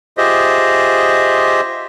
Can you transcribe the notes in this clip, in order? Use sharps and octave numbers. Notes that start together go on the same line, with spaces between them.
F4 G4 G#4 C5 D#5 E5